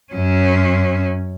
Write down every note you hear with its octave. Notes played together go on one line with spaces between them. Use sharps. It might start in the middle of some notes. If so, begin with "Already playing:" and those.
F#2 C#4